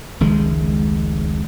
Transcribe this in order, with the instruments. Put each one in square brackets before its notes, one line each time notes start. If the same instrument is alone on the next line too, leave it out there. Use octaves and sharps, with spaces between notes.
[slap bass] F1 C#2 D#3 G#3